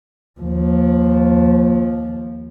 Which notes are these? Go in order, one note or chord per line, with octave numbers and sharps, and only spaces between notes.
D#2 F3